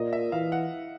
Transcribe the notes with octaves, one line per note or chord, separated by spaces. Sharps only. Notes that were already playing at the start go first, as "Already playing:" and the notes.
Already playing: A#2 D#5
E5
E3 F5
F#5